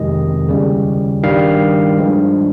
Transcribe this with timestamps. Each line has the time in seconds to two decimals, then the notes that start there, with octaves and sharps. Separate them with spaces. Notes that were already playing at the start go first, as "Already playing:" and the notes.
Already playing: F2 C3 D#3 G#3 D#5
0.49 D#2 C#3 G3
1.23 G2 D#3 G3 F5
1.98 G2 F3 G#3